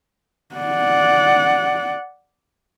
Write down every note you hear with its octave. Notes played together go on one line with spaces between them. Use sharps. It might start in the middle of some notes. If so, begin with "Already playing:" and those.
D5 F#5